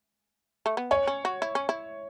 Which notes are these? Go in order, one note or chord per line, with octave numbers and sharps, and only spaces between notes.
A3
B3
C#4 C#5
C#4
F#4
E4
C#4
E4